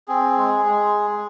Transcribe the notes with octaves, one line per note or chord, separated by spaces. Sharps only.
C4 G#4
G#3
G#3